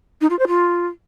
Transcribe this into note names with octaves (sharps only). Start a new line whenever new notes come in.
D#4
F4
C5
F4